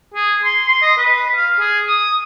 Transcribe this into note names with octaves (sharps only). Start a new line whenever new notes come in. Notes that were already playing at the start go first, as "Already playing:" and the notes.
G#4
C6
C6
D#5
B4
F5
G#4
D#6